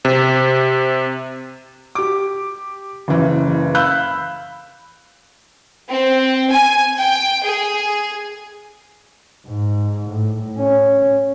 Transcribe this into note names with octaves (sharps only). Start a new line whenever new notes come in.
C3
G4 D6
F#1 C#3 E3
F5 B5 E6 F#6 G6
C4
G#5
G5
G#4
G#2
A2
C#4